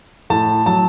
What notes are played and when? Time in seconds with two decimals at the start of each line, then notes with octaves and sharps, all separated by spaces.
0.30 A2 A5
0.66 F#3 A5